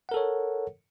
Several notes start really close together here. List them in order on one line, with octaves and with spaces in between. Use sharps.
F#5 A#4 A4 C#5